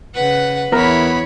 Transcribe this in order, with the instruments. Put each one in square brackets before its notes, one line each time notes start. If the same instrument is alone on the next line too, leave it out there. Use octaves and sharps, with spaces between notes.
[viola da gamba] C#3 B4 [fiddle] F#5
[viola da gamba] E2 C#5 [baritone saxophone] B3 [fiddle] E4 B5 [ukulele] A#4